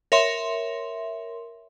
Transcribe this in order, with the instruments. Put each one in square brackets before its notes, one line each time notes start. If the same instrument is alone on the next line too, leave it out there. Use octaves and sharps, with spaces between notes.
[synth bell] A#4 C#5 E5 C6